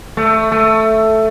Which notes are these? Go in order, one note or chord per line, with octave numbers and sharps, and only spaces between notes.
A3
A3